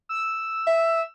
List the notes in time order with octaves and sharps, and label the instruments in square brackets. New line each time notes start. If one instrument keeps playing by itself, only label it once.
[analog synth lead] E6
[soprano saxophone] E5